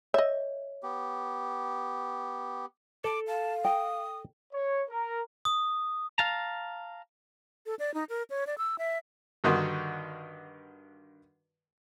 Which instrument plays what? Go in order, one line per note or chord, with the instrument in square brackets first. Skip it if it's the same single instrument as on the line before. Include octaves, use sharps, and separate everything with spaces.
[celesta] C#5 [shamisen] D#5 E5
[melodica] B3 G4
[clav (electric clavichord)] A4 [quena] D6
[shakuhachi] F5 [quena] A5
[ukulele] G5 [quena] D#6
[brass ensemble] C#5
A#4
[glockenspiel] D#6
[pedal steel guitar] F5 A5 A#5
[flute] A4
D5
D#4
A#4
C#5
D5
E6
E5
[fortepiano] G2 D3 D#3 D#4 F#4 C6